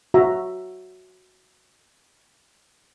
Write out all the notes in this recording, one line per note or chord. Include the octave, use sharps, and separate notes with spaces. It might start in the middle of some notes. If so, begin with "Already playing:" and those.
F#4 E5 A#5